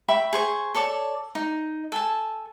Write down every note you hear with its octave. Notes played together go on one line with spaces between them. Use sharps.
E5 G5 B5 C#6
G#4 C5 C#6
A4 C#5 D5 A5
D#4
A4 G#5 A5